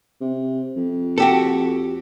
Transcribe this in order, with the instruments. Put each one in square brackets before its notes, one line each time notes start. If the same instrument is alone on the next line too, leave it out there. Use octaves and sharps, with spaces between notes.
[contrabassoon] C3
F2
[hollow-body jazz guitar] F#4 G4 A4